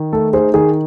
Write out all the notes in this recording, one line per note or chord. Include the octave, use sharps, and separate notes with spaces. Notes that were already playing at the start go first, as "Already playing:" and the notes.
Already playing: D#3
A3 A4
D#4 G#4 C5
D#3 G#4